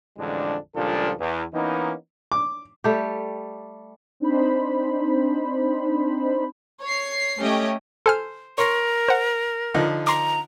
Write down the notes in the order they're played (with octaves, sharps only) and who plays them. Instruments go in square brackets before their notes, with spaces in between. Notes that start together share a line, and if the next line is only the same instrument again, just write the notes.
[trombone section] A1 F2 D3 G#3 D4
C#2 A#2 F3 G3 D4 A4
E2
E3 A#3 B3 C#4 D#4
[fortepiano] D6
[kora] G3 A3 G4
[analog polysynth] C4 D4 D#4 C5 B5
[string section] C#5 C7
A3 C#4 G4 D#5 G5
[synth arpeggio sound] A4 G#5 F6 [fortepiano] C5
[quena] A#4 [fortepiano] C#5 C6
[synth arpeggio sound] C5 F#5
[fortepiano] D3 F3 D#4
[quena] A#5 [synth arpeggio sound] C6 D6